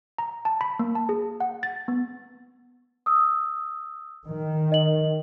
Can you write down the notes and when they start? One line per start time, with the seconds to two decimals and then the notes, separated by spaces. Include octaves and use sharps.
0.18 A#5
0.45 A5
0.61 B5
0.79 A#3
0.95 A5
1.09 G#4
1.40 F#5
1.63 A6
1.88 B3
3.06 D#6 E6
4.27 D#3
4.72 D#5 F#7